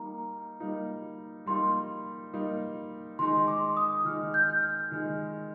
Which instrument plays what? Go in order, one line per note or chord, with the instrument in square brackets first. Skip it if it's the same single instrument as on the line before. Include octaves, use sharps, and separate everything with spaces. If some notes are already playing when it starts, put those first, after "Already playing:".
Already playing: [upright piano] G3 A#3 D#4 [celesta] A#5
[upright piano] G3 A#3 D#4
[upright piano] G3 A#3 D#4 [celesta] C6
[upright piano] G3 A#3 D#4
[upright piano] D#3 G#3 D#4 [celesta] C6
[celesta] D6
D#6
[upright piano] D#3 G#3 D#4 [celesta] F6
[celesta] G6
F6
G6
F6
[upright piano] D#3 G#3 D#4